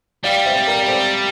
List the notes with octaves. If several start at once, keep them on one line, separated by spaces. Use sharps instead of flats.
G3 D5 F5
C5 E5
A#4 D5
D5
A4 C5